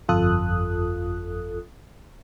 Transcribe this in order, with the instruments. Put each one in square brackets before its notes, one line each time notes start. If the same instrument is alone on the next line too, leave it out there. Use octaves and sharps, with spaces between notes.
[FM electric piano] G1 F2 F4 A4 D#6 F#6